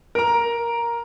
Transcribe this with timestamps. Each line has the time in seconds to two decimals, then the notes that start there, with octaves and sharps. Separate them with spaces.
0.15 A#4 A#5